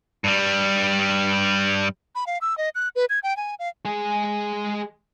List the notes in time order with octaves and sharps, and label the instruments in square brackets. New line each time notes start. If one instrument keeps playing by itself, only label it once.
[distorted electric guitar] G2 G3
[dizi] B5
F5
E6
D#5
F#6
B4
G#6
G5
G#5
F5
[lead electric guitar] G#3 G#4